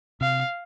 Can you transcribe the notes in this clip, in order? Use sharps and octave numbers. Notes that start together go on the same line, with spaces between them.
C3 F5